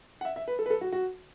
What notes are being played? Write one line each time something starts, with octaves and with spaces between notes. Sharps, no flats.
F#5
E5
E5
B4
A4
B4
A4
F#4
F#4